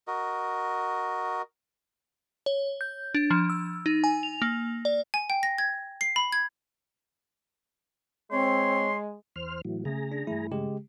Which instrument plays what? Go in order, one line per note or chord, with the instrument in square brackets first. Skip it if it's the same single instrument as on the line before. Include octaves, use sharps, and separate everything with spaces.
[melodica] F#4 A#4 D#5
[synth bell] C#5
G6
D4
F3
E6
D#4
G#5
F7
A#3
D5
[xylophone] G#5
G5
A#6
G#6
C7
B5
G#6
[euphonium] G#3 [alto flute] C4 [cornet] C#5 [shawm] C6
[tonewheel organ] E2 C5 F6
A2 E3 F#3
[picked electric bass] C#3 A3 C#4 [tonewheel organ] G#4 A#5
[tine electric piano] D4
[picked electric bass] G2 E3 A3 [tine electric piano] E4
[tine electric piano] C#3 G#3 G4